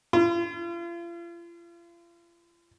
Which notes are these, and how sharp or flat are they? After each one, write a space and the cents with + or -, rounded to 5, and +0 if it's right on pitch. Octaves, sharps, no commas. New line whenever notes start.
F4 -40